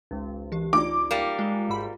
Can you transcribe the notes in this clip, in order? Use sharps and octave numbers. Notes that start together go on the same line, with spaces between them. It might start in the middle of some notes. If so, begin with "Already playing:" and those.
G#1 C#2
E3 G4
D#4 F4 D5 D6
G3 A#3
G#3 F4
G#1 G#2 B5